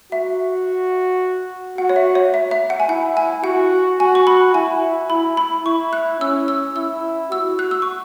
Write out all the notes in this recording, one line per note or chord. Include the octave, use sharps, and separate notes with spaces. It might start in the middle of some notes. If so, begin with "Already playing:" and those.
F#4 E5
F#4 F#5
C#5
E5
C#5
E5
E5
F#5
G#5
E4 F#5
G#5
F#4 F#5
F#4 G#5
C#6
B5
E4 G#5
E4 B5
B5
E4 C#6
F#6
C#4 E6
E6
E4 E6
F#4 E6
F#6
E6
C#6